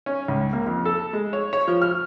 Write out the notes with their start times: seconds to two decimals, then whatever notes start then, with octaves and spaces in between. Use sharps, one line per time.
0.06 C#4
0.28 C#2
0.53 A#3
0.66 F2
0.85 A4
1.13 G#3
1.33 C#5
1.53 C#5
1.67 F3
1.82 F6